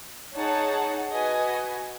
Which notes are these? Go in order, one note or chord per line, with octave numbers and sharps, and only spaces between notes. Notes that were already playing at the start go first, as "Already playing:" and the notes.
D#4 G#4 C#5 F#5 A5
F#4 B4 D#5 G#5